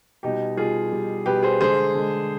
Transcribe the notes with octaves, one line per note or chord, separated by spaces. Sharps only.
B2 G3 D#4 G4
B2 G3 F4 G#4
B2 G3
B2 G3 G4 B4
G#4 C5
D3 G#3 G#4 C5
D3 G#3